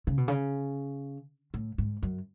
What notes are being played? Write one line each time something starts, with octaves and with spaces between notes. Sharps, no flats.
C#3
B2
C#3
A2
G#2
F#2